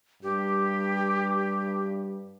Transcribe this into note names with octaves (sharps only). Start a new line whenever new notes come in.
G2 G4